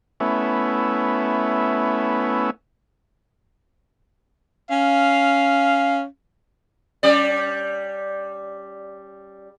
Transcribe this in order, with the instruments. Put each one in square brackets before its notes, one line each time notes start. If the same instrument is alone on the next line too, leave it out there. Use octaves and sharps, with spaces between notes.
[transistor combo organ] A3 B3 C#4 E4
[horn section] C#4 F5
[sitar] G3 C#4 D5